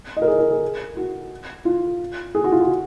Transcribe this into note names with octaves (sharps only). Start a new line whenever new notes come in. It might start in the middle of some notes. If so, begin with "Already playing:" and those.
D#5
A#4
G#4
A#4
G#4
F#4
F4
G#4
F#4
F4
F#4